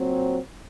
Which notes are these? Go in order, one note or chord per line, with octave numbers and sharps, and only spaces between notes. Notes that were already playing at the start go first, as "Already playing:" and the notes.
Already playing: A#2 F#3 C4